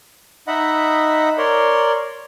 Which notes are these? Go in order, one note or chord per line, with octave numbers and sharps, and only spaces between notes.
D#4 D#5 E5 F#5 B5
A#4 C#5 D5 C6